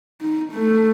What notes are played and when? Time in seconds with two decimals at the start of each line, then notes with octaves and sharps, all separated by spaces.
0.21 D#4
0.53 A3